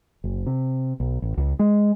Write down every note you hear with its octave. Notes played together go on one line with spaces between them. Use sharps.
F#1
C3
B1
A1
C#2
G#3